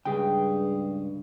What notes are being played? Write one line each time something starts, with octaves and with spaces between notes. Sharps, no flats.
C#2 G2 G#4 G5